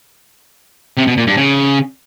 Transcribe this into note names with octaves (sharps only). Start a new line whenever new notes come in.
C3
B2
A#2
G2
C#3